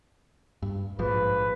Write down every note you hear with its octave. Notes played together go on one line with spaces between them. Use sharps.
G2
A#1 G#2 F3 B4